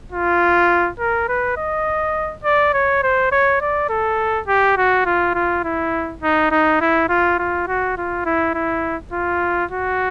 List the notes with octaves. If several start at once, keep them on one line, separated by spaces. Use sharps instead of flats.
F4
A#4
B4
D#5
D5
C#5
C5
C#5
D5
A4
G4
F#4
F4
F4
E4
D#4
D#4
E4
F4
F4
F#4
F4
E4
E4
F4
F#4